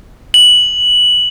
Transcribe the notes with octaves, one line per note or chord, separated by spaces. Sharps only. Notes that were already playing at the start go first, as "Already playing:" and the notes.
F#7